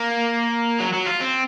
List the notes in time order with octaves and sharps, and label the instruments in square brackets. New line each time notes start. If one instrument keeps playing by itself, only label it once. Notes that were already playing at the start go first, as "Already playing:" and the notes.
Already playing: [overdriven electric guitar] A#3
F#3
F#3
F4
C4